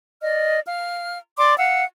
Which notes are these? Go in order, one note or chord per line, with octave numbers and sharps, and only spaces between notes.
D5 D#5 F6
F5 F6
D5 C6 D6
F5 F#5 E6